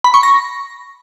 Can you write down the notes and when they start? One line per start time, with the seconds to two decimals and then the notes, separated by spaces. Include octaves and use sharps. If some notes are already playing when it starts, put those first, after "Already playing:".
0.04 B5
0.14 C#6
0.23 A#6